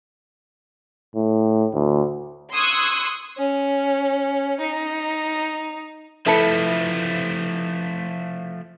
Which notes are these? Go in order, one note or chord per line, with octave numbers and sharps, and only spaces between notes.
A2
D2
C6 C#6 D#6 E6 F#6 G#6
C#4
D#4
F3 A3 E4 A4 B4 A5 C#7